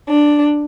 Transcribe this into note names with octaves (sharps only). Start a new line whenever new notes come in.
D4